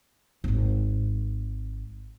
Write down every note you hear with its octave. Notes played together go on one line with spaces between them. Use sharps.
D#1 G#1